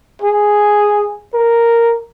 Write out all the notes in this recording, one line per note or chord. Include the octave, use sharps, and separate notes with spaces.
G#4
A#4